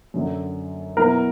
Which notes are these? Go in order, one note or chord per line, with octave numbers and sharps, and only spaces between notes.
F#2 D3 F#3
B2 F#3 B3 E4 A#4